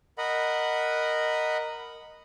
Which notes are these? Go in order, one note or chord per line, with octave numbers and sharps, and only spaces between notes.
A#4 D#5 F#5 B5